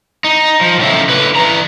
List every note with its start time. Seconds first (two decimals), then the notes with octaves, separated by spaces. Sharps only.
0.24 D#4
0.61 F3
0.79 A2 C#3 E5
1.09 D3 B4
1.35 E3 A#5